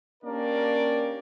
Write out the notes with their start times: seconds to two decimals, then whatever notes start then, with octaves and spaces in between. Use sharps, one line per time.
0.24 A#3 C#4 D4 G4 A#4 D5